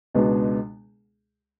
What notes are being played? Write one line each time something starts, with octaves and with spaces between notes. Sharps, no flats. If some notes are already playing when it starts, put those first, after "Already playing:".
C#2 B2 G#3 B3 D4